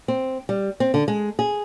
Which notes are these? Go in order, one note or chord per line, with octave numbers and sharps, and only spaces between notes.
C4
G3
C4
D3
G#3
G#4